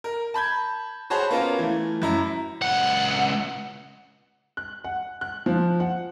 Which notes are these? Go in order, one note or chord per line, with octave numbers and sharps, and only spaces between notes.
A#4
A5 B5 G6 G#6
F#4 G#4 C5 C#5 A5 B5
A#3 B3 C#4 F4 A#4
E3 A3
F#2 E4 A#5
C#2 F#5
F#6
F#5
F#6
F3
F#5